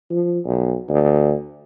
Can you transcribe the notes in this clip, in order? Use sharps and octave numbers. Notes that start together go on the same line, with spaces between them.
F3
B1
D2